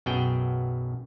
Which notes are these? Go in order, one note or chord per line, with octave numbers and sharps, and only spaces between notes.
B1 F#2 B3 F#4 G#4 G5